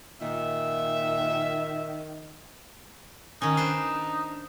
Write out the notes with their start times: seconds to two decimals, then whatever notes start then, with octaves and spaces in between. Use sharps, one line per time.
0.21 A#2 D#3 E5
3.42 D#3 C#4 D#4
3.57 D4 B4 C5